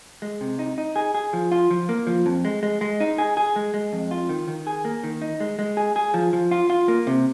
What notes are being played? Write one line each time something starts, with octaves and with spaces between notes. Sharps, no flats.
G#3
C3
D#4
D#4
G#4
G#4
F3
F4
F3
A#3
F3
F2
G#3
G#3
G#3
D#4
G#4
G#4
G#3
G#3
F2
F4
D#3
D#3
G#4
A#3
D#3
D#4
G#3
G#3
G#4
G#4
F3
F3
F4
F4
A#3
C3